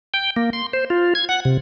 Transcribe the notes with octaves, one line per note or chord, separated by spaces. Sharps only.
G5
A#3
C6
C5
F4
G#6
F#5
C3